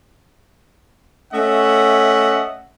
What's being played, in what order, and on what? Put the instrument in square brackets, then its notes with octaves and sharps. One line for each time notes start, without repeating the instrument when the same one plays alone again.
[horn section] A3 C#4 D#5 E5 F#5